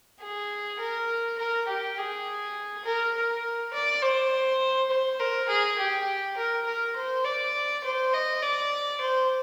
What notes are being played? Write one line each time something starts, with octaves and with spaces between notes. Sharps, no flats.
G#4
A#4
A#4
G4
G#4
A#4
A#4
D5
C5
C5
A#4
G#4
G4
A#4
A#4
C5
D5
C5
D#5
D5
C5